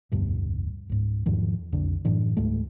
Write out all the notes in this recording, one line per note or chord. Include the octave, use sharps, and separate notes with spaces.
F1 D2 G2 B2
C#2 G#2
E2 G#2 D#3 F3
B1 F2 D3 D4
F#2 A2 E3 D4
C#2 G#2 G#3 A3